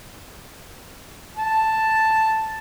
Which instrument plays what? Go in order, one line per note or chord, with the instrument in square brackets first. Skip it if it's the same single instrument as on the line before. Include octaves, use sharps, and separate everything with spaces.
[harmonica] A5